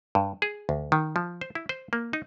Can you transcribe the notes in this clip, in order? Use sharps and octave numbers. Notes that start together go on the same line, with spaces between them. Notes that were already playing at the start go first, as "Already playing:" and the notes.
G2
G#4
D2
D#3
F3
C5
E4
C5
A#3
D#4